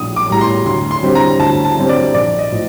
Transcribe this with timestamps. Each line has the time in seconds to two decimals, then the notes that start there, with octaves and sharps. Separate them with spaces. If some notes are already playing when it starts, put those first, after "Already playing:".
Already playing: A#1 A2 G3 D#6
0.16 D6
0.30 A2 G3 A#5
0.41 C6
0.66 D2 C6
0.91 C6
1.03 D3 G3 C4
1.15 A#5
1.39 D2 A5
1.65 A5
1.77 D3 G3 C4
1.89 D5
2.14 A#1 D5
2.39 D#5
2.51 A2 F3